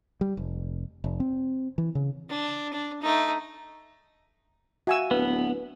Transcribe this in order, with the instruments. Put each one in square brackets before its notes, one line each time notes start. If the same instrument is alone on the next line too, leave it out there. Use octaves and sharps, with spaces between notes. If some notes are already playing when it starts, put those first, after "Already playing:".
[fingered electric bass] G3
F1
F1
C4
E3
C#3
[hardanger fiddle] D4
D4
A3 D#4
[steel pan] F#4 G#5 E6 [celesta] E5 F5
[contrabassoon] D1 [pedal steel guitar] B3 [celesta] B4